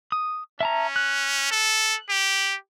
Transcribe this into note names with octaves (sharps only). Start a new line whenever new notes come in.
D#6
C#4 E5 A5 A#5
F#6
A4
G4